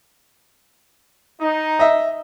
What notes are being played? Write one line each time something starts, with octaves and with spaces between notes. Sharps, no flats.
D#4
D#5 E5